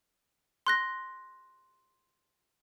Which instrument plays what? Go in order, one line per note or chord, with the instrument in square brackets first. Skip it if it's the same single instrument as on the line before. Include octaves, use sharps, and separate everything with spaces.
[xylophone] C6 F#6 A#6